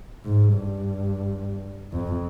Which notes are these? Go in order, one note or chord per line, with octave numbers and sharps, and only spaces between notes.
G#2
G2
F2